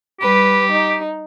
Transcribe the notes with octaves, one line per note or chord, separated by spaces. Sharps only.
G3 G4 B4
D#4